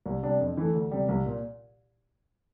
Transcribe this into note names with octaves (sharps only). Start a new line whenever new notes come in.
C2
C3 G3 D4
F2
E3 A3
D2
C3 G3
C2
A#2